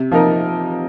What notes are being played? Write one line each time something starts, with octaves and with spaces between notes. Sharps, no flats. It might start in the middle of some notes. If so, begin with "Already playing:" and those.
Already playing: C3
F3 A#3 D#4 A#4